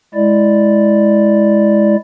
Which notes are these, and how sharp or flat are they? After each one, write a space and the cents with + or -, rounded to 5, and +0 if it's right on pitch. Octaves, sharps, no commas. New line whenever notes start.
G#3 +10 E4 +0 D5 +0